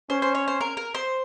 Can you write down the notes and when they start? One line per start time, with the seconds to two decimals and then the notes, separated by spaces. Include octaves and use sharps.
0.10 C#4 C5
0.22 C5
0.35 C#5
0.48 C5
0.61 A#4
0.77 A#4
0.94 C5